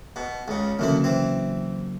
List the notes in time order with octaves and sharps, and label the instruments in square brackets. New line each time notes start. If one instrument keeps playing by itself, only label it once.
[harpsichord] B2
C#2 C#3
[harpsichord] D2 E3 E4 [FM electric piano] C#3 F#3 A#3
[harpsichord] E3 C4